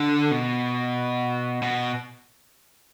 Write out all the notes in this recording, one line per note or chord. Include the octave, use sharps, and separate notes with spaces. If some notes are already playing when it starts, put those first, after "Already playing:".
Already playing: D3
B2
B2